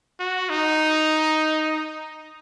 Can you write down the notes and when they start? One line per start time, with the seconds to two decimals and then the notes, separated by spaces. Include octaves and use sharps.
0.20 F#4
0.49 D#4